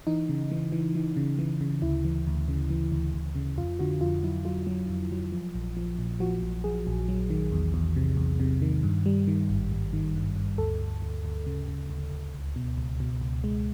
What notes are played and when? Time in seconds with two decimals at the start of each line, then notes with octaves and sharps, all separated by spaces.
0.07 E3 D#4
0.29 C#3
0.51 E3
0.72 E3
0.95 E3
1.17 C#3
1.39 E3
1.61 C#3
1.82 D2 E4
2.05 E3
2.27 D2
2.48 C#3
2.70 E3
2.92 D2
3.14 D2
3.35 C#3
3.58 F2 F4
3.79 D3 F#4
4.01 F2 F4
4.23 F#3 E4
4.45 F#3 F4
4.67 F#3
4.89 F2
5.12 F#3
5.32 F3
5.55 A#1
5.77 F3
5.99 A#2
6.20 F3 F#4
6.43 A#1
6.64 F3 G#4
6.87 A#1
7.08 F#3
7.30 D#3
7.52 E2
7.74 E2
7.96 C3
8.17 E2
8.40 C3
8.62 D#3
8.83 G2
9.06 G3
9.27 D#3
9.49 G#1
9.72 G#1
9.93 D#3
10.15 G2
10.36 G2
10.58 D2 A4
10.81 D2
11.02 D2
11.25 D2
11.47 C#3
11.68 C#3
11.89 D2
12.12 D2
12.34 C#2
12.56 B2
12.77 C#2
13.00 B2
13.21 C#2
13.44 G#3